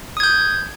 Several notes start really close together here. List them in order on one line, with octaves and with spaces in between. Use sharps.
D#6 G#6 G6